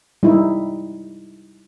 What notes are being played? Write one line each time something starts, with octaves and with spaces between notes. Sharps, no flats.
G3 D#4 E4